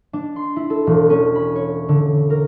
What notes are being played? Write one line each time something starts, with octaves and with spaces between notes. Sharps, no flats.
D4
C6
E4
A4
E1
C#4
B5
C#5
D3
A#4